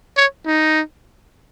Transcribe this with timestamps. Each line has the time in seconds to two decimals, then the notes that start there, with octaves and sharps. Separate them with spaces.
0.17 C#5
0.46 D#4